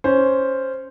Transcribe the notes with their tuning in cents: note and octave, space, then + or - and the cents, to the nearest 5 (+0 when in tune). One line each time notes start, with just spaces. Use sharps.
C#4 +0 C5 +0